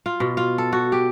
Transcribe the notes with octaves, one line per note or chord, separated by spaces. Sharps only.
F4
B2
F4
A4
F#4
G4